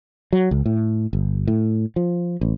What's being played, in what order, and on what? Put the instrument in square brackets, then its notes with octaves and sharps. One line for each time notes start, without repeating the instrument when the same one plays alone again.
[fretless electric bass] F#3
C#2
A2
G1
A2
F3
A1